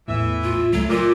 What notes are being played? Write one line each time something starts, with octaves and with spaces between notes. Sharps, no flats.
A#1 E2 A2 E3 E5
F4
C#2 F#3 A3
A#2 F4 D6 E6 F6